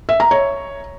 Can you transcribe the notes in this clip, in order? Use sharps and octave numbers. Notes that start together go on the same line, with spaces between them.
E5
A#5
C#5